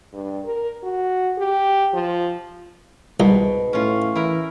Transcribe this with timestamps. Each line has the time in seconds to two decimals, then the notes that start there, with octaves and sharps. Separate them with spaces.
0.13 G2
0.44 A#4
0.83 F#4
1.38 G4
1.94 F3
3.20 C2 G#2 B2
3.73 A2 C#4 F4
4.15 E3 E4 A#4